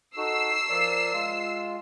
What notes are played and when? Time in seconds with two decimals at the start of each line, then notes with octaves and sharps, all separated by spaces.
0.17 D#4 F#4 A4 E6 C7
0.70 F3 A#4 D5
1.13 G#3 F4